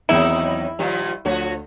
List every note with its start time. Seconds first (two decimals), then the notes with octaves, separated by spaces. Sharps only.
0.09 E2 D#3 E3 F#3 C4 D#4 E4
0.79 A#2 D#3 F3 G3
1.25 D2 F3 F#4 C#5